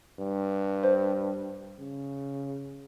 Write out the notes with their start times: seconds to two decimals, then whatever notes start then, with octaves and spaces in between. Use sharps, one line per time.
0.19 G2
0.83 C5
1.79 C#3